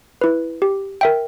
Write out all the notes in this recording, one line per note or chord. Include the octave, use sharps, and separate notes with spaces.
E4 B4
G4
A#4 E5 G5